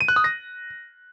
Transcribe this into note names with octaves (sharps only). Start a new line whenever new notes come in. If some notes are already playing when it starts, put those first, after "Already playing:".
D#7
F#6
D#6
A#6